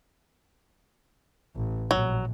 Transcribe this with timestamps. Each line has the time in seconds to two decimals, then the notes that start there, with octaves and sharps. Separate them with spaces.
1.56 A1
1.91 A#1 F#3